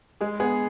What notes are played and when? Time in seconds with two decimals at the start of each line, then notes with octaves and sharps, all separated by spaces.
0.21 G#3 G#4
0.40 B3 G#4